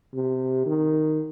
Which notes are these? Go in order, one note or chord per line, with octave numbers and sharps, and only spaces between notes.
C3
D#3